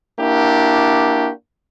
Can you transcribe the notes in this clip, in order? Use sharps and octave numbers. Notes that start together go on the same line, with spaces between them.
A#3 D4 E4 F#4 G4